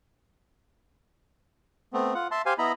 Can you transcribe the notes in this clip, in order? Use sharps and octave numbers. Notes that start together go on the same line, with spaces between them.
A3 B3 C4
F4 F#5
E5 A5 C6
G4 C5 F5 G#5
B3 E4 D#5 A#5 B5